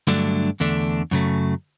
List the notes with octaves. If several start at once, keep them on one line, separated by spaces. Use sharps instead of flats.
G2 D3 F#3 A3 D4
E2 D3 A3 D4
F#2 C#3 F#3 A3